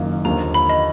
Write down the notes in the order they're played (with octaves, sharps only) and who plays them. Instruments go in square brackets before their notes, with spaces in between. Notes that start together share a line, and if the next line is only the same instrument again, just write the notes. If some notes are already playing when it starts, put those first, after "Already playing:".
Already playing: [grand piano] F#1 F#2 D#3 A#3 F4
[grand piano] D#2 D3 F3 [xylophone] A#5
[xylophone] B5
D#5